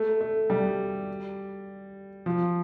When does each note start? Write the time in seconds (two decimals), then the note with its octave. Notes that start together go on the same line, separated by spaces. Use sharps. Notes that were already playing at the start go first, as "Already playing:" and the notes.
Already playing: A3
0.20 A3
0.50 G3
2.26 F3